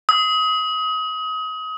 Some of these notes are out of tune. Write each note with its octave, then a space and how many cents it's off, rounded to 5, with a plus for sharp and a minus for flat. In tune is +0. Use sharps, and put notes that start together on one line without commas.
D#6 +30